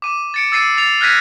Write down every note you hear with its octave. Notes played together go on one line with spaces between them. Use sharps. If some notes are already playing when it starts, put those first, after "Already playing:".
D6 D#7
A6 C#7 D7
E6 A6 C7 D#7
A6 C7 F7
F6 F#6 G#6 A#6 B6 D#7